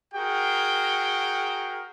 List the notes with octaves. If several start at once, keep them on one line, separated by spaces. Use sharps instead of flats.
F#4 G#4 A#4 G5